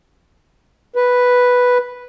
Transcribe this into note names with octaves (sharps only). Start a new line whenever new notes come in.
B4